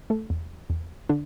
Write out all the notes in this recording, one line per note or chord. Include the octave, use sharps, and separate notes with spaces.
A3 A4
E2
E2
D3 D4